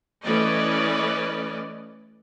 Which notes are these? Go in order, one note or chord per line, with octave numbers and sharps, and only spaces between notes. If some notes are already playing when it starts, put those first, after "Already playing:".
E3 A3 C#4 B4 D5 D#5